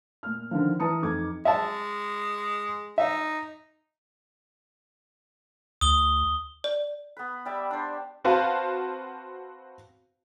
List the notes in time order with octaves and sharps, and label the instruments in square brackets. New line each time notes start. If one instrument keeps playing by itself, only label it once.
[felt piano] A#2 F6
D3 D#3 F3
E3 B4 A5 A#5 D#6 C#7
F2 D#4 D6 G#6
[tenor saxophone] G#3 [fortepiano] E5 A5
[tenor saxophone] D#4 [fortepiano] E5
[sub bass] D2 [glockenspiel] D#6 G7
[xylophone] D5
[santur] B3 B4
G3 G4 D5 E5
D4 C5
[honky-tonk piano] C4 F#4 B4 C5 F5 A5